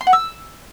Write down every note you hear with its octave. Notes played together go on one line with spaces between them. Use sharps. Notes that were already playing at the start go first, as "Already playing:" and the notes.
C6
F#5
E6